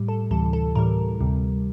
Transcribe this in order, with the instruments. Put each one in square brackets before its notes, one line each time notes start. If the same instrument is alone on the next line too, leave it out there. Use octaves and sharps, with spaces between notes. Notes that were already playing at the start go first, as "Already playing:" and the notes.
Already playing: [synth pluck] A2 G3
A4
D2 C3 E3 G3 A4
A4
A2 E3 G3 A#4
D2 C3 G3